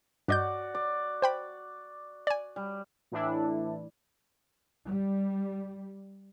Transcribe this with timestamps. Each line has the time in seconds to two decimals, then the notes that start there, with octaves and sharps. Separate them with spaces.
0.28 G2 F#4 D5 D#5 G6
0.75 D5
1.22 C5 G5 B5
2.27 D5 G#5
2.56 G3
3.12 A2 E3 D4 E4
4.88 G3